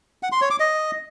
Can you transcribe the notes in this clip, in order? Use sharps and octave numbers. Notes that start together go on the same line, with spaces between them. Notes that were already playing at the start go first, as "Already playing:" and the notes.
F#5
C6
C#5
D6
D#5